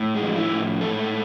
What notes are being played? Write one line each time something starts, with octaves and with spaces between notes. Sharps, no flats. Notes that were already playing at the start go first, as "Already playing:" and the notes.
Already playing: A2
G#3
F3
E4
A2
G#2 A4